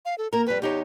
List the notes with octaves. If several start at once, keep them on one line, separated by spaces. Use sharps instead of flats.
F5
A4
A#3 A#4 A#5
F2 G3 B4
E2 D#4 G4 C#5